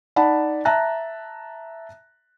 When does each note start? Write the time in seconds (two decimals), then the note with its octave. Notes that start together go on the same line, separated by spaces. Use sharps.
0.16 D#4 D5 F#5 A5 B5
0.65 E5 A5 A#5 F#6 A#6